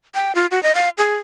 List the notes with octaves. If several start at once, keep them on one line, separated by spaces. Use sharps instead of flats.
G5
F4
F#4
D#5
F5
G#4